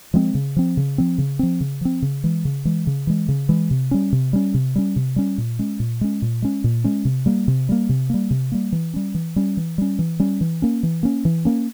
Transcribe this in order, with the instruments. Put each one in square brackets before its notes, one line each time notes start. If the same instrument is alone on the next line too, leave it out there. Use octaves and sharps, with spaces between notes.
[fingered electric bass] F3 G#3 C4
C#3
F3 C4
C#3
F3 C4
C#3
F3 C4
C#3
F3 C4
C#3
E3 G#3
C#3
E3 G#3
C#3
E3 G#3
C#3
E3 G#3
C3
G3 C#4
C3
G3 C#4
C3
G3 C#4
C3
G3 C#4
A#2
G#3 C#4
A#2
G#3 C#4
A#2
G#3 C#4
A#2
G#3 C#4
C3
G3 A#3
C3
G3 A#3
C3
G3 A#3
C3
G3 A#3
E3
G3 C#4
E3
G3 C#4
E3
G3 C#4
E3
G3 C#4
E3
A#3 C#4
E3
A#3 C#4
E3
A#3 C#4